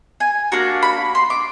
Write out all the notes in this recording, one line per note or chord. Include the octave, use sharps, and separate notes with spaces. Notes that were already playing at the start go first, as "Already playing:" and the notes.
G#5
A#3 D4 F#4 A#5
B5
C6
D6